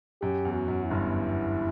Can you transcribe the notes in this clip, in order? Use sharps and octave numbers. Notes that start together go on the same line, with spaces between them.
F#2 G4
E2
F#4
F#2
E4
G1 G2